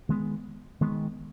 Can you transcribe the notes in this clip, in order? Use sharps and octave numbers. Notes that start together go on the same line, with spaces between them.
D#3 G#3 B3
D#3 G#3 B3